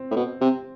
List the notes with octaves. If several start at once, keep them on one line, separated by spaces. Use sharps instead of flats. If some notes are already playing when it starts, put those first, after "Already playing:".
Already playing: C4
A2
B2
C3